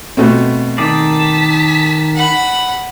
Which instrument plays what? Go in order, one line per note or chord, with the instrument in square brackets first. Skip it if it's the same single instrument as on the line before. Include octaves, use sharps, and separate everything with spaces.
[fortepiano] B2 A3 C4
[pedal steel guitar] D#3 G#4 D5 [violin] A5 B6
[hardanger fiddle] F#5 B5